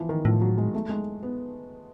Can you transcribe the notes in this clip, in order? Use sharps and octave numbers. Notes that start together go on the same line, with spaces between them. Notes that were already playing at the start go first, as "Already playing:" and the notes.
Already playing: E3 F3
D#3
A2 F3
F#3
G#3
A3
G#3
B3